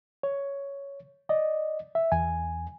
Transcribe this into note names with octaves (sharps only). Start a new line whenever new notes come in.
C#5
D5 D#5
E5
E2 G#5